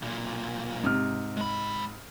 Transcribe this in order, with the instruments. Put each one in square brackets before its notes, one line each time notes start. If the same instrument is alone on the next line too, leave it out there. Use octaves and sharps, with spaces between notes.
[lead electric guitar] B1 A#2
[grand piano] G#2 C3 F6
[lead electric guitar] G#3 B5